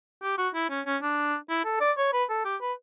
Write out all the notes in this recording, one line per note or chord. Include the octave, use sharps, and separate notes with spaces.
G4
F#4
E4
C#4
C#4
D4
E4
A4
D5
C#5
B4
A4
G4
B4